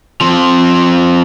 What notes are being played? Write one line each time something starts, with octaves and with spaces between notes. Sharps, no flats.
F3 C4